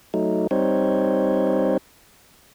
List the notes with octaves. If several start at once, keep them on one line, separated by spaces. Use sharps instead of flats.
F#3 A3 D#4
G3 C4 D#4 C5 C#5